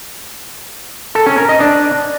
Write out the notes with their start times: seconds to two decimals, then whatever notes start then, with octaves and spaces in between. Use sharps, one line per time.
1.15 A4
1.26 C#4
1.38 A#4
1.49 D#5
1.60 D4